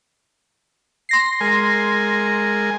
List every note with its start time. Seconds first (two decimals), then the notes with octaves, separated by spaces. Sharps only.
1.09 C6 A#6 C7
1.41 G#3 A#4 G#5